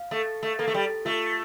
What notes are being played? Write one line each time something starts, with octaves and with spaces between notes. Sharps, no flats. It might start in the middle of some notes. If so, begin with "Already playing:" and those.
Already playing: F5
A3 A4
A3
A#3 A4
A3
G3
A3 F4